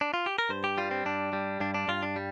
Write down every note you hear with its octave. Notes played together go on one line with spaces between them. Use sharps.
D4
F4
G4
A#4
G2 C5
G4
G3 F4
C4
G2 D4
G3
G2 D4
D4
G2 F4
D4
G3